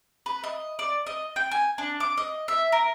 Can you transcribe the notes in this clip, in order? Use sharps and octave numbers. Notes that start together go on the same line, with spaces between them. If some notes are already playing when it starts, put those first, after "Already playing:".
B4
D#5
D5
D#5
G5
G#5
D4
D6
D#5
E5
A#4